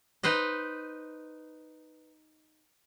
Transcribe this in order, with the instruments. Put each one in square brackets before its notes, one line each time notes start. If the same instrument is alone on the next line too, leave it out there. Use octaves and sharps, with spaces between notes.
[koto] D#4 B4 C5 D#5